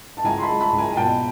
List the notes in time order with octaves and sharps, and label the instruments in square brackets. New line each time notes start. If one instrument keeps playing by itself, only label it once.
[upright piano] A5
C#2 G#5 A#5
C6
A5 B5
G#3
A5 B5
C#2
G#5 A#5
G#5
B2 G5 A5